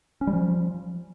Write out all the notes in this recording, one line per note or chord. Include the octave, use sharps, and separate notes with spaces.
C#4
G3
F3